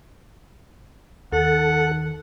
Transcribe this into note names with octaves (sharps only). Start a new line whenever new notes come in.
D#2 D#3 A4 F#5